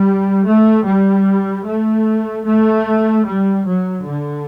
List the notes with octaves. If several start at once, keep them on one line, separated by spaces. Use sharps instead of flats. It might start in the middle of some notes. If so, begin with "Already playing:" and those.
Already playing: G3
A3
G3
A3
A3
G3
F#3
D3